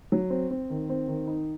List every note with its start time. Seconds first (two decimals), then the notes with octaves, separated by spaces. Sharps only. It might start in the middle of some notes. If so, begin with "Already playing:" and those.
0.12 F#3
0.30 C4
0.51 C4
0.70 D#3
0.89 C4
1.08 D#3
1.27 D#4